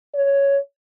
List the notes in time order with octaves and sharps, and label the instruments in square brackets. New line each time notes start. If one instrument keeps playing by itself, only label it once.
[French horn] C#5